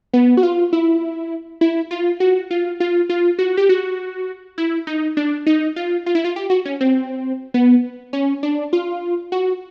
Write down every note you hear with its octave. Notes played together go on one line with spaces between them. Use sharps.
B3
F#4
F4
E4
E4
F4
F#4
F4
F4
F4
F#4
G4
F#4
E4
D#4
D4
D#4
F4
F4
E4
F4
G4
F#4
C#4
C4
B3
C#4
D4
F4
F#4